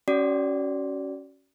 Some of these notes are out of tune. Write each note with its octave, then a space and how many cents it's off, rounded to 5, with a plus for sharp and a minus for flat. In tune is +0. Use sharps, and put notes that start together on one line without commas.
C#4 +0 F#4 +25 D5 -15